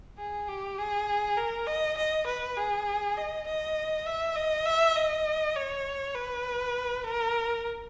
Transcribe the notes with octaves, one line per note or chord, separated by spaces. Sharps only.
G#4
G4
G#4
A#4
D#5
D#5
B4
G#4
D#5
D#5
E5
D#5
E5
D#5
C#5
B4
A#4